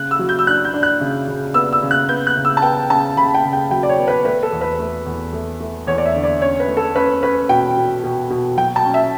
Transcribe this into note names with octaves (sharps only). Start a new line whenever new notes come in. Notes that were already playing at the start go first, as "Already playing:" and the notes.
Already playing: C#3 F#6
E6
F#3
G6
E6
D4 F#6
G6
D4
F#6
C#3
C#3
B3 E6
E6
C#3
F#6
B3 G6
F#6
C#3
E6
A5
B3 G5
C#3 A5
C#3 B5
G5
C#3
G5
F#3 G5
D5
C#5
B3
B4
A3 B4
A4
E2
B4
A3
E2
A3
A3
E2 C#5
D5
E5
D3
D5
C#4 C#5
B4
A3
A4
C#4 B4
C#4 B4
B2 G5
B2
B2
B2
F#3 G5
A5
C#4
E5